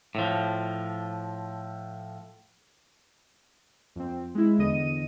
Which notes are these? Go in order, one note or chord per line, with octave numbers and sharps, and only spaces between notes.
A2 F3
F2 C4
G#3 E4
E2 D3 D#5 D#7